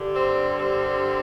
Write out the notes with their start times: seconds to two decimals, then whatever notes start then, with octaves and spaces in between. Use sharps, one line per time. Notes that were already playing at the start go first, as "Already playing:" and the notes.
Already playing: G2 D3 G3
0.14 C4
0.58 C4